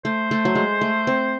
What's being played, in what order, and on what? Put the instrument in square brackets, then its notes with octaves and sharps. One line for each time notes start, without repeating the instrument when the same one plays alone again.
[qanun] A3 [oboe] C5
[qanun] A3
F#3
G#3
A3
C4